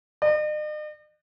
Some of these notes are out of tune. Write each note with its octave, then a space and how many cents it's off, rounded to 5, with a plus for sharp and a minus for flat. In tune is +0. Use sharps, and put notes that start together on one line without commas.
D#5 -45